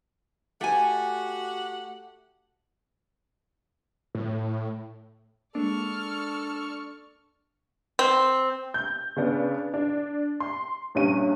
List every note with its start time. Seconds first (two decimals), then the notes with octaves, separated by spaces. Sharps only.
0.61 A3 F#4 G4 F#5 G#5
4.15 A2
5.55 G#3 A#3 D4 A4 D5 C#6 F6
7.99 C4
8.74 G6
9.16 C#3 B3 D4
9.74 D4
10.40 C6
10.95 A#1 G2 C#4 D#7